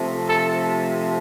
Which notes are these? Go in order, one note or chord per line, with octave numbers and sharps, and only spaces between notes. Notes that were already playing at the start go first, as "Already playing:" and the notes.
Already playing: C3 F3 A3
A4